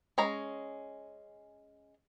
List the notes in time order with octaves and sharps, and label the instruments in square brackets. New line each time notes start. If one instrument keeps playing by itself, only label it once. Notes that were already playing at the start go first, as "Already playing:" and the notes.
[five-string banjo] G#3 C#4 A#5